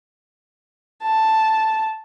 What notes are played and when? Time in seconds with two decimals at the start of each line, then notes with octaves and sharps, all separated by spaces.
1.03 A5